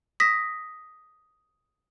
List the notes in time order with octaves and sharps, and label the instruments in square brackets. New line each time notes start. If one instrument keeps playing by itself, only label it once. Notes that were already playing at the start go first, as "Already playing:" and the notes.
[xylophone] D#6 A#6 B6